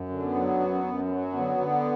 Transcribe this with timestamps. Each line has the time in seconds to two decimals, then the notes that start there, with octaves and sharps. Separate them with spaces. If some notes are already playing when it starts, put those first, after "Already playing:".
Already playing: F#2
0.09 D3
0.22 B3
0.34 F#3
0.59 F#2
0.84 F#2
1.08 F#3
1.33 D3 B3
1.58 D3